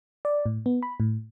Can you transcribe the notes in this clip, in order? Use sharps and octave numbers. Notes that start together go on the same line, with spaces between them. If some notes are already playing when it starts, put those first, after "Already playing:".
D5
A2
B3
B5
A2